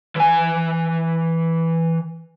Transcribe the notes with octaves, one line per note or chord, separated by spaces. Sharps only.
E3 G#5